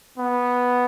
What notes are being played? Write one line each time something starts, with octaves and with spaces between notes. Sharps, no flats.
B3